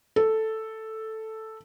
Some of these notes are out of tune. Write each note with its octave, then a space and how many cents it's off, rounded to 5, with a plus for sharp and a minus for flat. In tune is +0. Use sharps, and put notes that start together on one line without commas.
A4 +0